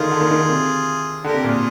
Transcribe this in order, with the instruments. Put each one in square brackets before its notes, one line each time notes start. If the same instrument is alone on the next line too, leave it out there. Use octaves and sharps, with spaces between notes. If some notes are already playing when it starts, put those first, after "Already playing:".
Already playing: [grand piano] D3 D#3 [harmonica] F4 G#4
[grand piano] D3
D#3
D#3
D3
C3
[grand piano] D3 [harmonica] G4 A#4
[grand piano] C3
[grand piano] A#2 [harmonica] F4 G#4